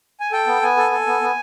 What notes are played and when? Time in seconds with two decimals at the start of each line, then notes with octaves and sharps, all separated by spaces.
0.20 G#5
0.32 A4 G5
0.47 B3
0.62 B3 G#5
0.77 A4
0.92 A4
1.07 B3
1.21 B3